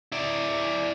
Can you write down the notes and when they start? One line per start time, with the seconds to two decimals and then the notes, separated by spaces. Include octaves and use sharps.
0.12 E4 D5